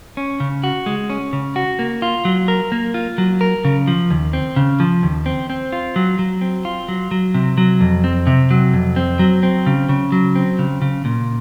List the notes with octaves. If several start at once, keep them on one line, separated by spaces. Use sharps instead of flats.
C#4
C#3
F#4
G#3
C#4
C#3
F#4
A#3
F4
F#3
A#4
A#3
F4
F#3
A#4
C#3
F3
D#2
C4
C#3
F3
D#2
C4
C4
F4
F#3
F#3
C4
F4
F#3
F#3
C3
F#3
F2
C4
C3
F#3
F2
C4
F#3
C4
C#3
C#3
F#3
C4
C#3
C#3
A#2